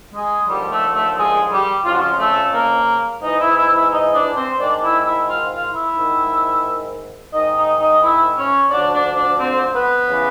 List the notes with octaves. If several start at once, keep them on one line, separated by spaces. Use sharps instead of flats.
G#3 G#4
D#2 D3 F3 G3 G4
A3 A4
A3 A4
G#3 G#4
G3 G4
F2 C#3 F3 F4
F#4
F3 F4
A3 A4
A#3 A#4
G#2 E3 D#4 D#5
E4 E5
E4 E5
E4 E5
D#4 D#5
D4 D5
C4 C5
G#2 D#3 D4 D5
E4 E5
E4 E5
F4 F5
F4 F5
E4 E5
G#2 D#3
G#2 D#3 D#4 D#5
D#4 D#5
D#4 D#5
E4 E5
C#4 C#5
D2 D3 F3 D4 D5
D4 D5
D4 D5
C4 C5
B3 B4
C#3 E3